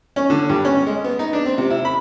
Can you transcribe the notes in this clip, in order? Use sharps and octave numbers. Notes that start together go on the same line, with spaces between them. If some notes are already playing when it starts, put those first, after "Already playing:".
C#4
D3
G2
C#4
G#3
B3
D#4
D4
C4
C3
E4
B5